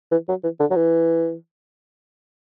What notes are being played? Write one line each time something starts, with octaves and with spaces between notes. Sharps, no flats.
E3
F#3
E3
D3
F#3
E3